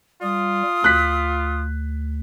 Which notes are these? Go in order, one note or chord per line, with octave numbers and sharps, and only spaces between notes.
G3 F4 D#6
D2 F#6 B6